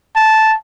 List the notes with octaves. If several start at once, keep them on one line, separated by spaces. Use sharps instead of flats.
A5